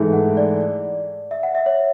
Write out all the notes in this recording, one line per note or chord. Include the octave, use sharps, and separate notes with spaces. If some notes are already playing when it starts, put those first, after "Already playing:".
Already playing: G#2 E3 A3 G#4
F#5
D5
E5
F#5
E5
C#5